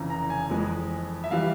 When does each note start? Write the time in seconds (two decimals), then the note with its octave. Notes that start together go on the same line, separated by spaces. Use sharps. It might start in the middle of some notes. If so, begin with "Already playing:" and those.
Already playing: F1 F2 C#3 E3 A#5
0.10 A#5
0.30 G#5
0.50 F2 E3 G#3
1.24 E5
1.31 E3 G3 F5